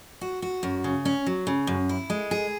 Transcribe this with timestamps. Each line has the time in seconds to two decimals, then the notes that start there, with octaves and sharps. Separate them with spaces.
0.21 F#4
0.42 F#4
0.63 F#2
0.84 C#3
1.05 C#4
1.26 F#3
1.47 C#3
1.67 F#2
1.89 E4
2.10 G#3
2.31 G#4